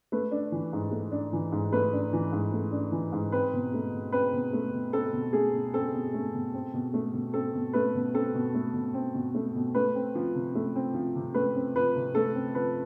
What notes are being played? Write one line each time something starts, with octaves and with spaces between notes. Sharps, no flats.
A3 B4
D4
E3
G#2
A3
D4
E3
G#2
A3 B4
D4
E3
G#2
A3
D4
E3
G#2
C4 B4
B2
A3
B2
C4 B4
B2
A3
B2
C4 A4
B2
A3 G#4
B2
C4 A4
B2
A3
B2
C4
B2
A3
B2
C4 A4
B2
A3 B4
B2
C4 A4
B2
A3
B2
C4
B2
A3
B2
A3 B4
C4
F3
C3
A3
C4
F3
C3
A3 B4
C4
F3 B4
C3
A3 A4
C4
F3 B4